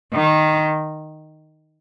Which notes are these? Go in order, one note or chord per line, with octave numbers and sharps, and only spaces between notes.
D#3